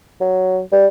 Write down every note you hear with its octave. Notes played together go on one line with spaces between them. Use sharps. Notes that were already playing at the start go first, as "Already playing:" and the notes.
F#3
G3